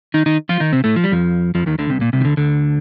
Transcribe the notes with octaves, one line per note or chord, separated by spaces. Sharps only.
D#3 D#4
D#3 D#4
F3 F4
D#3 D#4
C3 C4
A2 A3
F3
G3
F2 F3
F2 F3
D#2 D#3
D2 D3
C2 C3
A#2
C2 C3
D#3
D2 D3
D2 D3